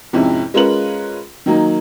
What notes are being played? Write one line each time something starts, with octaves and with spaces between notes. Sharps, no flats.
F2 G#2 C3 C#4 E4
G#3 C#4 F4 A#4 B4 F#7
D#3 F#3 A#3 D#4